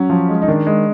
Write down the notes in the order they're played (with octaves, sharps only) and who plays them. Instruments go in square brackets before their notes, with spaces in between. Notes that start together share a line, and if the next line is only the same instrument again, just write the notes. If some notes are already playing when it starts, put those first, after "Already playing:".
Already playing: [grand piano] F#3 [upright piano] C#4
[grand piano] F3
G#3
[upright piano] D#4
[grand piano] D#3 [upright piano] D4
[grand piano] G#3